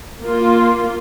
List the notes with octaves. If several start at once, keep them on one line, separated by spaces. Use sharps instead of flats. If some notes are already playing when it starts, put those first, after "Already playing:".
A#3 F4